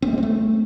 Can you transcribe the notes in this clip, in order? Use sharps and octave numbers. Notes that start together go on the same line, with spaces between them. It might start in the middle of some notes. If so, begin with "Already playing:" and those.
C4
A3
G#3
C4
A3